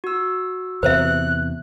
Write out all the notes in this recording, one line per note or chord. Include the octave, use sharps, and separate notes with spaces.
F#4 E6
E2 C3 B4 C5 E5 F#6